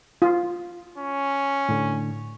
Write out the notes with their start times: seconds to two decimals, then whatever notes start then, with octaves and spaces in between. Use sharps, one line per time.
0.22 F4
0.98 C#4
1.69 A2 D3